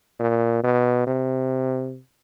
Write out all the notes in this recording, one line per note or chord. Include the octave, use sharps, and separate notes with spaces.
A#2
B2
C3